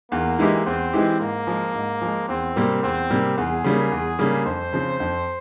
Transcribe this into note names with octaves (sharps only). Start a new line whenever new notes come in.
E2 A#3
E3 G#3 E4 G4
E2 C4
E3 G#3 E4 G4
G#2 A#3
F3 G#3
G#2
F3 G#3
E2 C4
C3 G3 A#3
E2 C4
C3 G3 A#3
E2 G#4
C#3 G3 A#3
E2
C#3 G3 A#3
F2 C5
C#3 F3 C4
F2